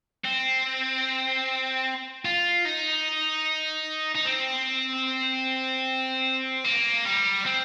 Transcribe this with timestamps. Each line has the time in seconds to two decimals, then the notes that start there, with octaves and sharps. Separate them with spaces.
0.25 C4
2.25 F4
2.65 D#4
4.15 D#4
4.25 C4
6.64 A#3
7.05 G3
7.46 C4